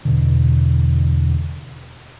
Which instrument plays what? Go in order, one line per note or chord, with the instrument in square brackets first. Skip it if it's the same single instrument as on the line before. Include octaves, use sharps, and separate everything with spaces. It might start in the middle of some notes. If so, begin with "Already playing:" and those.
[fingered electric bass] E2 B2 D3